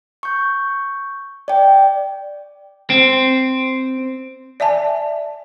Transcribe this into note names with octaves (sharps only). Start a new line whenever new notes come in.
C#6 G6
D5 G5
C4
D5 E5 G#5 A5